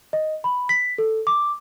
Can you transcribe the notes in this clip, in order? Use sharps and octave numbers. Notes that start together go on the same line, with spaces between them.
D#5
B5
B6
A4
D6